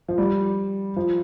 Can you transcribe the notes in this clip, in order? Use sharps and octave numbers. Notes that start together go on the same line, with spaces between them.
F3
G3
F3